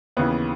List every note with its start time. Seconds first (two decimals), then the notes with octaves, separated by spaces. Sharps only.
0.17 D#2 C#3 E3 B3